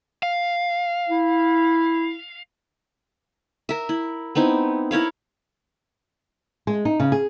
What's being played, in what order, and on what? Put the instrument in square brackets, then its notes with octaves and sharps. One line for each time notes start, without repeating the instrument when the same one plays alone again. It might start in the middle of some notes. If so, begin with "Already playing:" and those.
[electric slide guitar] F5
[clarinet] E4
[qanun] A#4 E5
E4
B3 C4 D#4 E4
E4 A#4 C#5 F5
[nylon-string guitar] G#3
D#4
C#3
G#4